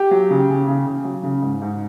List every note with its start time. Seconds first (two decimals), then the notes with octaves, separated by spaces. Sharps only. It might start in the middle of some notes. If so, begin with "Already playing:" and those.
Already playing: G4
0.11 F#3
0.30 C#3
0.49 C#3
0.67 C#3
0.86 C#3
1.04 F#3
1.23 C#3
1.42 G#2
1.62 G#2